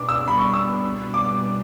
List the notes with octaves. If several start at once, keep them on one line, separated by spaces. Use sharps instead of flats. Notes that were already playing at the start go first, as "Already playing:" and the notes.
Already playing: B2 D4 D6
E6
B2 G3 B3 D4 B5
C#6
E6
D6